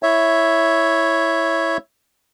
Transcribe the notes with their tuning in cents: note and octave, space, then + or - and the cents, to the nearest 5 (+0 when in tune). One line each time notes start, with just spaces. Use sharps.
E4 +0 C#5 +0 E5 +0